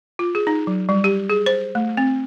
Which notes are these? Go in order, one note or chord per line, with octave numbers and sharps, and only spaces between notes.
F4
G#4
D#4
F#3
G3
G4
G#4
C5
A3
C4